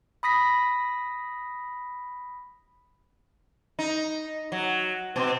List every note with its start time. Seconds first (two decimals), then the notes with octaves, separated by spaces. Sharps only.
0.23 B5 D#6 A#6 B6
3.79 D#4
4.52 F#3
5.16 B2 C4